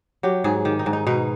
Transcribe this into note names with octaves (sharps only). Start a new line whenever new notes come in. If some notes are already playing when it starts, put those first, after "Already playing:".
F#3 G4
G#2 G#4
D#3 G4
D#4
G#2
D#4
B2 D#4